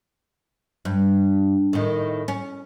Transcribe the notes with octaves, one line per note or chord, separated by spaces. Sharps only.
G2
A2 D#3
C#4